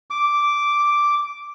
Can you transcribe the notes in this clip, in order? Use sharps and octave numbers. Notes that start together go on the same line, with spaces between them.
D6